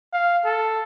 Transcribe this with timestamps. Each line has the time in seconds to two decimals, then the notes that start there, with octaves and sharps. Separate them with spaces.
0.13 F5
0.45 A4